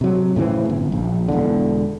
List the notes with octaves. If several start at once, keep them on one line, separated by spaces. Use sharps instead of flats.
C3 F#3
A2 C#3 E3 C4
G1
A#1
E1 B1 E2 D3